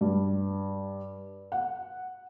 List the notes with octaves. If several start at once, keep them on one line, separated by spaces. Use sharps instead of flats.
G2
F#5